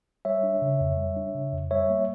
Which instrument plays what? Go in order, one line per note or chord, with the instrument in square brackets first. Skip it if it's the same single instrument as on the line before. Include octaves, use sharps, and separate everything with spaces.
[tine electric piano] G3 C#5 E5
D4
C#3
F2
G3
D4
C#3
F2
G3 C#5 E5
A#3